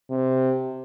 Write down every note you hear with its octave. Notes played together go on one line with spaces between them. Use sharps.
C3